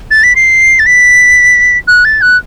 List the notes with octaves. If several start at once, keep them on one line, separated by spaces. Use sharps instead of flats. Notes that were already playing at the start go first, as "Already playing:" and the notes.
A6
B6
C7
A6
B6
F#6
A6
F#6